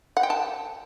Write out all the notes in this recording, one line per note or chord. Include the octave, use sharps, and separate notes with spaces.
F#5
G5
A5